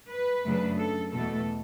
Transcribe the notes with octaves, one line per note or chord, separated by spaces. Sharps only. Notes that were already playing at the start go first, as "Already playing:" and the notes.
B4
F#2 C#3 F#3 A3 D4
A4
E2 B2 A3 A4